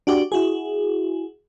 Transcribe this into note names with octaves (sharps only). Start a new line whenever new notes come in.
D4 F#4 G4 D5
E4 F#4 G#4